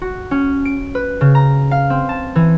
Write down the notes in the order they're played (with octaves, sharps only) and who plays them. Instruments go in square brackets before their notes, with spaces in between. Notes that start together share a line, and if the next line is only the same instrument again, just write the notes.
[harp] F#4
C#4
D7
B4
C#3
A#5
F5
C4
A5
E3